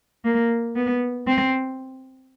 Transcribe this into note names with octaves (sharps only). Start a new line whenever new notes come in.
A#3
B3
C4